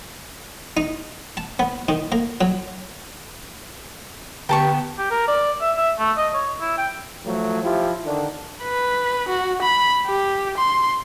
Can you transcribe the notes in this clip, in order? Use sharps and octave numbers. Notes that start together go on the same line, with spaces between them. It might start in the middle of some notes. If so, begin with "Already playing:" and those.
D#4
A5
B3
D#3
A#3
F#3
D3 B3 G4 G5 A5 C#6
G4
A#4
D5
E5
E5
A3
D#5
C#5
E4
G5
F3 F#3 A3
F3 E4 F4 G4
D3 D#3 D4
B4
F#4
B5
G4
C6